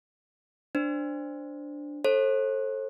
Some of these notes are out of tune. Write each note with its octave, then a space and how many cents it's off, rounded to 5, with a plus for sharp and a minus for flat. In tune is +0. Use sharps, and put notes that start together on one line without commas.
D4 +0 C5 +0
A4 +0 C5 +45